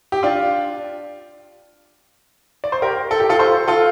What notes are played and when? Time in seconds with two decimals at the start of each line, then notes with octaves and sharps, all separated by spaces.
0.12 G4
0.23 D4 F4
2.64 D5
2.72 C5
2.82 G4 A#4
3.11 A4
3.20 G4
3.29 F4 A4
3.39 A4 C5
3.68 F4 A4